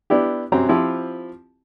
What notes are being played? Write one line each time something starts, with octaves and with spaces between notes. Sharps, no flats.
B3 D4 E4 G4
F#2 F#3 C4 G4 A#5
F3 C4 E4 F4 G4